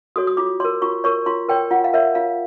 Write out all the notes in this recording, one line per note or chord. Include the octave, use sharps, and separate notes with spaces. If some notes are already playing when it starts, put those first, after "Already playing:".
F#4 A4 C#5 D#6
D#6
F4 D6
A#4 C#5 C6
F4 C#6
A#4 C#5 C#6
F4 C6
A#4 C#5 G5
F4 F#5
F5
A#4 C#5 E5
F4 F5